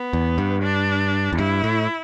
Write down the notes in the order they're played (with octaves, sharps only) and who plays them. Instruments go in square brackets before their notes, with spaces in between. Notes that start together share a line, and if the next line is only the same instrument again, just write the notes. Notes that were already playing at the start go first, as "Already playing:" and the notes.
Already playing: [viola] B3
[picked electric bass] E2
G2
[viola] D4
[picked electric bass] E2
[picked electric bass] G2 [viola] E4
[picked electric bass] A2